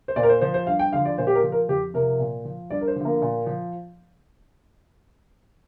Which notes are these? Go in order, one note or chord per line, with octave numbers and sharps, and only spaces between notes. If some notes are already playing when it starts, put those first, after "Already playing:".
C5
A#2 D5
A#4
C5
F3 C5
C5
G2 F5
G5
D3 F3 F5
D5
A#2 C5
G4
A#4
F3
A#4
F2 G4
C3 F3 A#4
A#2
F3
G2 D5
A#4
C5
D3 F3
A#3
A#2
F3